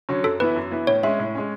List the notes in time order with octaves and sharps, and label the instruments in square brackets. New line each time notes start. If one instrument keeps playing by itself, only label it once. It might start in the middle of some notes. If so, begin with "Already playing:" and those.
[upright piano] D3 F#3 C#4
[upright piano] F#2 [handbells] A4
[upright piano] E3 B3 E4 [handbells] B4
[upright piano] F#2
E3 B3 E4
[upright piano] A2 [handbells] C#5
[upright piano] G#3 C#4 [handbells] E5
[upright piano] A2
G#3 C#4